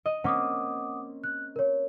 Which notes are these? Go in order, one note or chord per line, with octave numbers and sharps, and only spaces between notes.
D#5
A#3 C4 C#4 F#5 D6 D#6
F#6
A#4 C#5